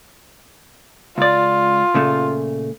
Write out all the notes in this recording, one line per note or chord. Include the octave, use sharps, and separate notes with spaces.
C#2 F4 D5
A#2 C#3 A3